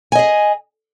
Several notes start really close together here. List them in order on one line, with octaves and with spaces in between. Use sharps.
G#5 D#5 G#4